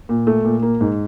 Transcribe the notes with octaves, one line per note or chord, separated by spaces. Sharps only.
A#2
A3
A#2
A#3
G#2